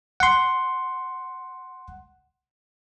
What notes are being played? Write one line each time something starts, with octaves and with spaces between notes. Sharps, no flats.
F#5 C6